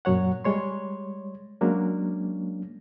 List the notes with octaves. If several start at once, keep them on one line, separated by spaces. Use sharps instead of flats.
F#2 A#2 F#3 C#5 F#5
G3 G#3 C#5 C6
F#3 G#3 A#3 C#4 D4